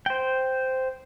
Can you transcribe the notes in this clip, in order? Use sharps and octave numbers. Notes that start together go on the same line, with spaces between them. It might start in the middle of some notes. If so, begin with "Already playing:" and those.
C5 G5